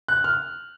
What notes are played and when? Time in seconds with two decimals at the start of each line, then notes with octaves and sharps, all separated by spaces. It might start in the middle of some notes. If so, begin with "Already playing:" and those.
0.08 F#6
0.24 F6